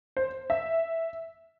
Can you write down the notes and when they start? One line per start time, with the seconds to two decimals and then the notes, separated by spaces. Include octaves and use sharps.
0.17 C5
0.50 E5